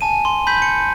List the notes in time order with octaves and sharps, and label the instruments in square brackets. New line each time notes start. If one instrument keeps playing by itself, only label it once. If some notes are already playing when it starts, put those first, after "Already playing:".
[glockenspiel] G#5 A5 D#7
C6
B5 G6 B6
C#7